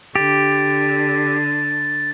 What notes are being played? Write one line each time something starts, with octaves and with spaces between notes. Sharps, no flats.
D3 G4 A6